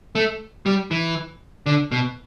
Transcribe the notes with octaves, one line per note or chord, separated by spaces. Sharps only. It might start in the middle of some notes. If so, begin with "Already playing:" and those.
A3
G3
E3
D3
B2